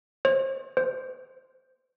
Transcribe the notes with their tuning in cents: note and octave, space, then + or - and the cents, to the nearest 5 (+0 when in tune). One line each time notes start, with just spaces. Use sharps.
C5 +35
C5 -10